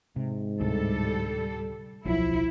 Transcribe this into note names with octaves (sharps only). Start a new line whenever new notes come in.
G#2 C3
D2 A2 C3 G3 A4
D1 B1 F3 F#3 E4